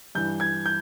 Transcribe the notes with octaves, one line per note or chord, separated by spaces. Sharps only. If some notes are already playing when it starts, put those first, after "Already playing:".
G2 E3 G6
G#6
G6